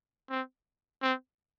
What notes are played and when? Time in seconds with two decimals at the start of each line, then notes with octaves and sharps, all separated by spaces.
0.30 C4
1.02 C4